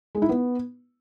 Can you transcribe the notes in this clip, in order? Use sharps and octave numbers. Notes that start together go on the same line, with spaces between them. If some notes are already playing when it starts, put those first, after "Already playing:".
G#3
E4
B3